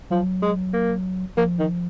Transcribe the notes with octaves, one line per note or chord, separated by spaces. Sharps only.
F3 F#3
G#3
A#3
F3 A#3
D#3